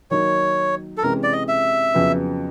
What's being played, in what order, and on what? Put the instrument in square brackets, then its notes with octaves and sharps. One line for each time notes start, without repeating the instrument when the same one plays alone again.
[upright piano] D#3 F#3 A#3 D#4 [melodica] C#5
[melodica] A4
[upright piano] C3 E3 G#3 C#4 [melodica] A#4
[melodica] D5
D#5
E5
[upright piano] F2 C#3 F#3 B3